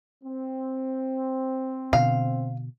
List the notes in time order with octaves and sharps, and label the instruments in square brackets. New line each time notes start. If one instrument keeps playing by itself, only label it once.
[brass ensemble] C4
[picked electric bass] B2 D3 [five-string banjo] F5